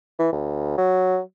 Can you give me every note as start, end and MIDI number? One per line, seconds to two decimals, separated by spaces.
0.19 0.28 52
0.33 0.76 38
0.78 1.20 54